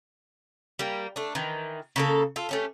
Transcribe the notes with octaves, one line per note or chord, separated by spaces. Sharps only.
G3 A#3
A3 D4
D#3 E3
C#3 A#3 A4
F4 A4
A3 C#4 G4